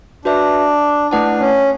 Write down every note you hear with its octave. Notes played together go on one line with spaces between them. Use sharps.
D4 F#4 B4 E5
A3 D4 E4 B4 F#5 A5
C#4